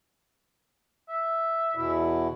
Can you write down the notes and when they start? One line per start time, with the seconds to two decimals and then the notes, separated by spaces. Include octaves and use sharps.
1.09 E5
1.75 E2 B2 E4